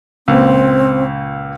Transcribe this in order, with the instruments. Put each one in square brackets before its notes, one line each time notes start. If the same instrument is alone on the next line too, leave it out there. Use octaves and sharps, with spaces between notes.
[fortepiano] C#2 A#2 [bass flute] C4